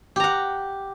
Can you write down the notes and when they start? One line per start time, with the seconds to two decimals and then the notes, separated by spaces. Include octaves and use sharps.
0.16 G4
0.20 A#5
0.24 F#5